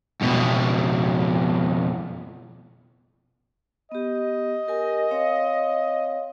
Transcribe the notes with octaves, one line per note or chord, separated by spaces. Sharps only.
F2 B2
B3 G4 D#5
G4 A#4 G#5
C4 C#5 F5